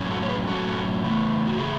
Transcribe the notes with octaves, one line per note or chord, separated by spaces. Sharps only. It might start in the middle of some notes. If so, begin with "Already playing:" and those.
Already playing: A2 F#3 C#4
F#4 A4
C#5
G#4 B4
A2 F#3 C#4 F#4 A4
C#3 E3 A3
F#4
C#3 E3 A3 E4 G#4